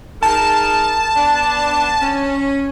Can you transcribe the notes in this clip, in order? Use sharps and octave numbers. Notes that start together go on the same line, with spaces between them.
D#4 G#4 A#4 A5
B3 D4
C#4